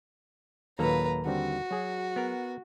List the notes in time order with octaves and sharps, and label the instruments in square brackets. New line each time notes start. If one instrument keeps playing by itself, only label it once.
[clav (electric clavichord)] D#2 A#3 A4 [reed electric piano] A#2 F#3 [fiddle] B4 A#5
[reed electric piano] D3 G3 C4 [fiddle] F#4
[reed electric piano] F#3 G#4
[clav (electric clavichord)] B3 A#4